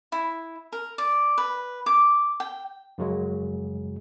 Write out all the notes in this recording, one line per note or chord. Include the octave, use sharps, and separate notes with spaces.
E4
A#4
D5
B4
D6
G5
F#2 C#3 F#3 G#3